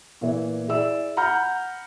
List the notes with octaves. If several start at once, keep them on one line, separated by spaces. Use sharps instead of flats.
A#2 E3
E4 G#4 D5 E6
F#5 A#5 B5 F6 G6